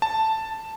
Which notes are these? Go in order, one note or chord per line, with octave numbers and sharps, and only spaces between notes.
A5